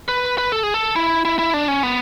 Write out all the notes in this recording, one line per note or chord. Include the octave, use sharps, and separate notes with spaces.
B4
B4
A4
G#4
A4
E4
E4
E4
D4
C#4
B3